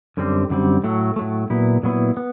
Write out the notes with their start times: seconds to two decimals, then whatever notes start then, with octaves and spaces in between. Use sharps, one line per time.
0.17 F#2 D3 G3 C4
0.50 F#2 D3 G3 C4
0.84 A2 F#3 A3
1.16 A2 F#3 A3
1.50 A#2 F#3 B3 E4
1.83 A#2 F#3 B3 E4
2.17 B3